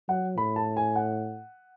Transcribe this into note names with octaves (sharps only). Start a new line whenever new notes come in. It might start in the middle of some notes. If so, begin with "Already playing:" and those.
F#3 F#5
A2 B5
A5
G#5
F#5